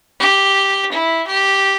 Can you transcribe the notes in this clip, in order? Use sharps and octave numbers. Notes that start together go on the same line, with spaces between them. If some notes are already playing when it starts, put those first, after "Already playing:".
G4
E4
G4